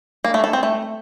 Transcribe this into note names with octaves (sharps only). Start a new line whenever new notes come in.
A#3
A3
A4
C4
A3